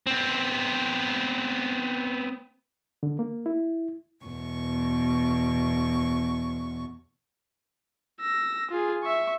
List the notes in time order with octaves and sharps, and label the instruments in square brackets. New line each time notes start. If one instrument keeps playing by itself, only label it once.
[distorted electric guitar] B3 C4
[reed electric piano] D3
A#3
E4
[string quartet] E2 B2 C#6
[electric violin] E6 A#6
F4 G#4
E5 C#6